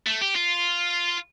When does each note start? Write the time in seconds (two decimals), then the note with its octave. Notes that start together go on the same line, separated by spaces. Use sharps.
0.06 A3
0.21 G4
0.35 F4